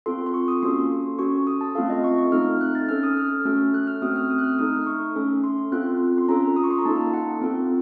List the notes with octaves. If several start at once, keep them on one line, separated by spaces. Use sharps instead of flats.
C4 F4 A4 C6
C6
C#6
D#6
A#3 C#4 F#4 A4 C6
C#4 F#4 A4 C#6
D#6
A5
A3 C4 F4 A4 F5
D#5
C#6
C#6
A3 C4 D#4 A4 F6
F#6
A6
C#4 A4 F6
D#6
F6
A3 C#4 F#4 A4
F#6
F6
A3 C4 F#4 A4 D#6
F6
D#6
F#6
F6
A3 D#4 A4 D#6
F6
C#6
A3 C#4 A4
C6
C6
C4 F4 A4 F#6
C6
C#4 F4 A4 A#5
D#6
C#6
C6
A#5
A#3 D#4 A4 A5
A5
F#5
C4 F4 A4